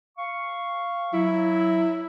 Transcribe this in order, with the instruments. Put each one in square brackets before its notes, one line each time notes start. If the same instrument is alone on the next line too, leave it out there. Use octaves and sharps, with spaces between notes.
[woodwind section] F5 C#6
[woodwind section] F#3 [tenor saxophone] E4